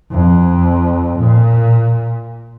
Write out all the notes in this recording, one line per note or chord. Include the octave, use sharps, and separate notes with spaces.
F2
A#2